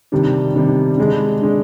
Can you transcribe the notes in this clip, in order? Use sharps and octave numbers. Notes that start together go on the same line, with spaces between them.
C3 D#3 G3 D4
C3 D#3 G3 D4
D3 G#3 D4
D3 G#3 D4